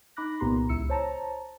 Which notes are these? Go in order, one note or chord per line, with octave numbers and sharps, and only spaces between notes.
D#4 B5 D6 F#6 A#6
C2 A#2 B3 G4 A#5 C6
C#2 E4 E6 C#7
C5 C#5 A5 A#5